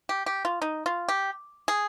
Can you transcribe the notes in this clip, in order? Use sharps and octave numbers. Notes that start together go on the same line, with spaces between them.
G4
G4
F4
D#4
F4
G4
G#4